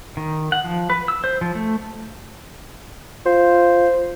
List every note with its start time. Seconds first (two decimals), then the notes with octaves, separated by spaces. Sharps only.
0.17 D#3
0.52 F#5
0.64 F3
0.90 B4
1.08 E6
1.24 C5
1.41 F3
1.55 A3
3.26 F4 C5